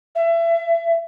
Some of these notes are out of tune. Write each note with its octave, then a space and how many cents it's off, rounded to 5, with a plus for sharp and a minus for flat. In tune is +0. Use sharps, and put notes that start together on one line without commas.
E5 +30